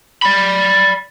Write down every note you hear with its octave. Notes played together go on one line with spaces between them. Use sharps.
D5 B5